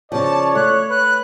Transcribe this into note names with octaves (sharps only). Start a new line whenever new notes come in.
C#3 F3 C#5 D5 A5
A3 F#6
B4 F#6